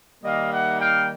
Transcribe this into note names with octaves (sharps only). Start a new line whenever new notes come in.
D#3 G3 A#3 D#4 D#5 F5
E5 F#5
F5 G5